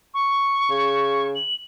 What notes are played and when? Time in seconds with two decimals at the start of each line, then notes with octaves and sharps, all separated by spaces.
0.14 C#6
0.70 C#3
1.35 F#7